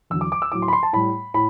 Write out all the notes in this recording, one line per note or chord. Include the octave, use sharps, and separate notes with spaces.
E2 D3 F#3 E6
D6
D6
E6
A2 F#3 D6
C6
B5
C6
A5
A2 G3 B5
A2 B5